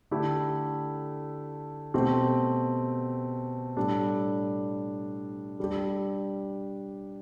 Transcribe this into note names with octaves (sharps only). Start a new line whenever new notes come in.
D3 A3 E4 G4
B2 A3 C4 G4
A2 G3 D4 A4
G3 D4 G4